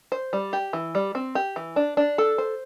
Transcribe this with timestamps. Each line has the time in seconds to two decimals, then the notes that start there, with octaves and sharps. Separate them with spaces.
0.12 C5
0.33 G3
0.53 G4
0.73 E3
0.95 G3
1.15 C4
1.35 G4
1.56 E3
1.76 D4
1.97 D4
2.18 A4
2.38 C5